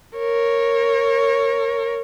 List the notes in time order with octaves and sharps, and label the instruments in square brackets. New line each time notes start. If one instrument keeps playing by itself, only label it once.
[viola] A#4 C#5